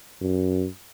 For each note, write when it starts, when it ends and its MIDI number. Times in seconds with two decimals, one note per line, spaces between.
0.21 0.66 42